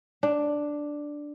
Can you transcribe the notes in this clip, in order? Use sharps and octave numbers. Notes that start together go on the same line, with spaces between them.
D4